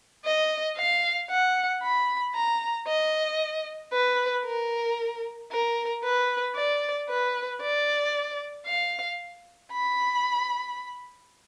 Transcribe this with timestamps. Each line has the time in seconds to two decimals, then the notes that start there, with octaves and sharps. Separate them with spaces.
0.25 D#5
0.77 F5
1.30 F#5
1.82 B5
2.35 A#5
2.87 D#5
3.93 B4
4.45 A#4
5.51 A#4
6.04 B4
6.56 D5
7.09 B4
7.62 D5
8.66 F5
9.72 B5